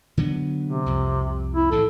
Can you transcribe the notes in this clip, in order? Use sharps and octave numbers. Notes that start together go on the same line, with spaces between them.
D3 F#3 B3
C3
C2 F2
E4
A1 A2 C#3 A4